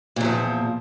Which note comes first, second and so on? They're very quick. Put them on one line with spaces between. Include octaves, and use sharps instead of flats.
A#2 E2 F3